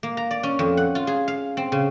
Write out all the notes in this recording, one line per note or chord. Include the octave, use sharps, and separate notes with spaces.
A#3
A#5
D5
C#4
F2
F#5
F4
G#4
F5
C4
C#3